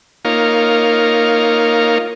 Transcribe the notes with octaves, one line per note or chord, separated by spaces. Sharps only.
A#3 D#4 F4 A#4 C#5 F5